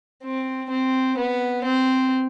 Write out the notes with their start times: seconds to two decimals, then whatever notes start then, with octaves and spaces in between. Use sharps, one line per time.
0.24 C4
0.70 C4
1.18 B3
1.64 C4